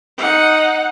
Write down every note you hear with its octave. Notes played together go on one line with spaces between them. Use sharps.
D#4 F#5